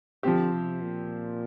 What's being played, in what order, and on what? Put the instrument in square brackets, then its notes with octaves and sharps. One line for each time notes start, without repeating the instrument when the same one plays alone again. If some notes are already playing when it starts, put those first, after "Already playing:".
[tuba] D3 [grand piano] F3 C4 G4
[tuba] C3
A#2